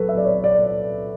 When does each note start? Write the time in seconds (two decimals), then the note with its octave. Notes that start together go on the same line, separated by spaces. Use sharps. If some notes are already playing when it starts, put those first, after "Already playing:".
Already playing: F#3 A4 B4
0.09 E5
0.17 D5
0.25 C#5
0.44 D5